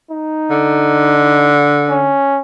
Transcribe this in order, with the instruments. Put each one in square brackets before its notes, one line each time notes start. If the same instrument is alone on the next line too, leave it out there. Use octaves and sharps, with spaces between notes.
[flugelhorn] D#4
[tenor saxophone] D3
[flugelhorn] C#4